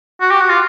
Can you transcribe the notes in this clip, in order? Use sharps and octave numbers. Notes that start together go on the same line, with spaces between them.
F#4
G4
F#4
F4